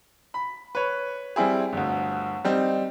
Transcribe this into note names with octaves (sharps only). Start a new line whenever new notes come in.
B5
B4 C#5
G3 C4 E4 G#4
G1 D2
G3 C4 D#4